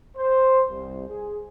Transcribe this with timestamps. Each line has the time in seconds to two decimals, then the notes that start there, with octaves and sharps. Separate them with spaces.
0.17 C5
0.68 C2
1.09 G#4